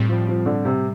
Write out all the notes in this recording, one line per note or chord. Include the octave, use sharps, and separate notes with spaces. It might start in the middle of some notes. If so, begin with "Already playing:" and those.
Already playing: A2 G3 C4
F3
F3
D3
C3